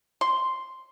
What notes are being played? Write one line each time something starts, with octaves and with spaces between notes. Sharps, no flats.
C6